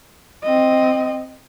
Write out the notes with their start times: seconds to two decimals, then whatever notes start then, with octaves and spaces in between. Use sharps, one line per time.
0.43 C4 D#5